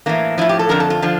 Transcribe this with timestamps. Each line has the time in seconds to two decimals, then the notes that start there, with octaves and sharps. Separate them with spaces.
0.06 A2 E3 A#3
0.38 A2 F3 E4
0.49 G4
0.59 A4
0.69 F2 D3 F3 A#4
0.80 A4
0.90 F4
1.02 D3 F3